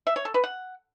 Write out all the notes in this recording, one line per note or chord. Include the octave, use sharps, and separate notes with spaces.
E5
C#5
A4
B4
F#5